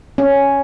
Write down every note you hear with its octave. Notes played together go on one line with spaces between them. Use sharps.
C#4